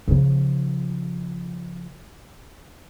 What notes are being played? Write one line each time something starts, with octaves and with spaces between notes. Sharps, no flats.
C#3 F3